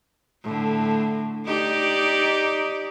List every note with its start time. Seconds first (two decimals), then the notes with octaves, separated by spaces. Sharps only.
0.44 A2 D3
1.46 D#4 G4 D5